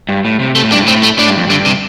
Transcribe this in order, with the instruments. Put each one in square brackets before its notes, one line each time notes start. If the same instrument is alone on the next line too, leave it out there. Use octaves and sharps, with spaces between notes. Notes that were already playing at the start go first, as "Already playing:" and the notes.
[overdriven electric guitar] G2
A2
C3
[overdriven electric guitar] C3 [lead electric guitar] A3
[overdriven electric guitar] A2
[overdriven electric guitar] G2 [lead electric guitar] D4
[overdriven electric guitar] A2
[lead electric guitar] C4
A3
[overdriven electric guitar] A2 [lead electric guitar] D4
[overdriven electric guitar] G2
F2
[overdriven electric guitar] G2 [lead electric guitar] D3
[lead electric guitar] C3